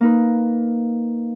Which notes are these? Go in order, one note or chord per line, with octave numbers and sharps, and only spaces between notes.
A#3 D#4 B4